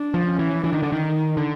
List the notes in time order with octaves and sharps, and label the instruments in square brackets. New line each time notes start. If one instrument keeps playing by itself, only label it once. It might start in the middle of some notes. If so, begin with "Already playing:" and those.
Already playing: [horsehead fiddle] D4
[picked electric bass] F3
[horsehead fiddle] C#4
[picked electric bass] E3
[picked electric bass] E3 [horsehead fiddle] D4
[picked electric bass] D#3
D3
D#3
[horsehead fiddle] D#4
[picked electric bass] D3